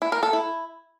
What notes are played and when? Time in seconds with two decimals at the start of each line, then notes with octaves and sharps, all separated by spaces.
0.02 E4
0.12 A#4
0.23 A4
0.33 E4